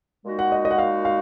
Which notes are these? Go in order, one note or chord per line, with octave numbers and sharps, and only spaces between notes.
A#2 G#3 D#4 F#4
F#5
D#5
D#5
F#5
F5
F5